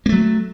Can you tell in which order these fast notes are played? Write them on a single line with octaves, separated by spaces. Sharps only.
A#3 A3 F#3